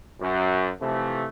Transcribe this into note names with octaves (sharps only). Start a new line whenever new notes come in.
F#2
C3 E3 F3 A3